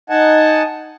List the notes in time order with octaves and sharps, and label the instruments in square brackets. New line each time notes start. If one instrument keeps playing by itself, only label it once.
[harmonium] D#4 D#5 F#5 G#5 A5